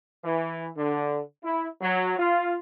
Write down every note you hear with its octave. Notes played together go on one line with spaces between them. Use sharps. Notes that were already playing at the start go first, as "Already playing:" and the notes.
E3
D3
E4
F#3
F4